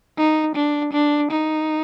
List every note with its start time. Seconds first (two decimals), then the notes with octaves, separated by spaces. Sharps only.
0.18 D#4
0.56 D4
0.94 D4
1.31 D#4